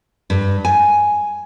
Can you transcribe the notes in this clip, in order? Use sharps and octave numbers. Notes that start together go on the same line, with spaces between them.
G2
G#5